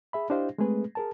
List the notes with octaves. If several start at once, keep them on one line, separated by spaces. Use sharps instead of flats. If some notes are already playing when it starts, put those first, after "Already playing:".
G#4 E5 B5
D4 E4 G4 C5 D#5 F5
G#3 A3 C4 G#4 B4
G#4 A#4 A5